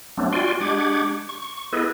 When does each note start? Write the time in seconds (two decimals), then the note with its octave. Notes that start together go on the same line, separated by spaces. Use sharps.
0.17 F#3 A3 B3 C4 D4
0.33 F4 F#4 D5 G5 G#5 C6
0.60 G#3 D4 G4 F#5 D6 G#6
1.29 C#6
1.73 B3 E4 G#4 A4 B4 D#5